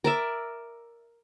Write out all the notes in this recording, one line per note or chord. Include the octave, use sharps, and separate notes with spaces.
A#4 D5 E5